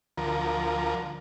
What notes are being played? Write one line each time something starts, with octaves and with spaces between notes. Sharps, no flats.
D2 F3 A#4